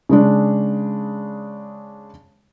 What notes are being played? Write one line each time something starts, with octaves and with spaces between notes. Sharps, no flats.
C#3 G#3 D4